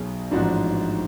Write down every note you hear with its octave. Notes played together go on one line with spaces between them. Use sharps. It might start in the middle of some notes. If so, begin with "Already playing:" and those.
Already playing: B1 B2 F#3 G#4
A1 G#2 F3 D4 F#4